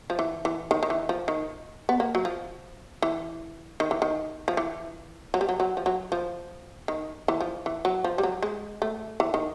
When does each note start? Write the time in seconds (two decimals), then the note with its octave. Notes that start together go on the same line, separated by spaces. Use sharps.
0.10 F3
0.19 E3
0.45 E3
0.71 D#3
0.83 D#3
0.90 E3
1.09 F3
1.28 D#3
1.89 B3
2.00 A#3
2.15 F#3
2.25 F3
3.02 E3
3.80 D#3
3.91 E3
4.02 D#3
4.48 F3
4.57 E3
5.34 F#3
5.41 G3
5.49 F#3
5.60 F#3
5.77 F3
5.86 F#3
6.12 F3
6.88 D#3
7.28 E3
7.41 F3
7.66 E3
7.85 F#3
8.04 F3
8.18 G3
8.23 F#3
8.43 G#3
8.82 A3
9.20 E3
9.34 D#3